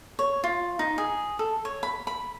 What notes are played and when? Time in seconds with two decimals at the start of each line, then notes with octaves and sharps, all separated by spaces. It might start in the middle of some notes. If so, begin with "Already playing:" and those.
0.19 C#5
0.44 F4
0.79 D#4
0.98 G#4
1.39 A4
1.65 C#5
1.83 B5
2.07 B5